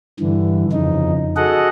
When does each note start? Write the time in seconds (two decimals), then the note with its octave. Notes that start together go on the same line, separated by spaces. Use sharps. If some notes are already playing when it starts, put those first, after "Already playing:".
0.20 G2 D3 E3
0.72 F2 C#3 D#4
1.37 F#4 G#4 A4 D#5 F#5